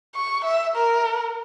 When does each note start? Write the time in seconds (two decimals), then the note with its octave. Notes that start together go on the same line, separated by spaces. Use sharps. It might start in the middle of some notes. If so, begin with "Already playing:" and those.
0.15 C#6
0.45 E5
0.75 A#4